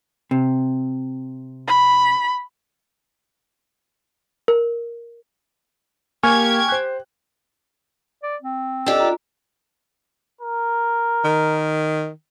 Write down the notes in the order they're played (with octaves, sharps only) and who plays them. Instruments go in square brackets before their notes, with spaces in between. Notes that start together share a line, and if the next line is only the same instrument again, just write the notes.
[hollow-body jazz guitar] C3
[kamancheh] B5
[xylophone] A#4
[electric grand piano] A#3 [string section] G4 G#6 [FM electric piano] G#5 C#6 F6
[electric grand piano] C5 F#6
[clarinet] D5
C4
[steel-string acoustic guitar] D4 G4 [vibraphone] A4 D#5 E6
[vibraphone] F4 A#5
[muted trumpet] A#4
[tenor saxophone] D#3